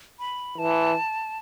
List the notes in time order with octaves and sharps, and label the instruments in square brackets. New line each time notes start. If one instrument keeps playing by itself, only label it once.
[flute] B5
[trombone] E3 [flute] A5